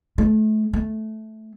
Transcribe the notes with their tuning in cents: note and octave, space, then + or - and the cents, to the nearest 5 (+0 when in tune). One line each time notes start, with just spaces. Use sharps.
A3 -30
A3 -10